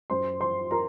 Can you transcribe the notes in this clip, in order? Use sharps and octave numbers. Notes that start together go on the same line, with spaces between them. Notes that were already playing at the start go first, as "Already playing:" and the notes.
F#2 C5 C6
F3 C5 C6
A#4 A#5